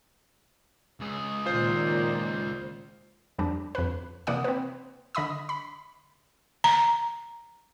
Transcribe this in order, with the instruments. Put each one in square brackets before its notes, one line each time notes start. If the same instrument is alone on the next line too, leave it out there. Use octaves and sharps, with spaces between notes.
[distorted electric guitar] C#2 G#4
[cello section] A#2 D#3 [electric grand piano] F4 C5
[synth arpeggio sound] F2 G3 D4
F2 B4
C3 E3 A#3 D5 F#5 D#6
C4 B4
D3 D#5 B5 D#6
B5
[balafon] A#5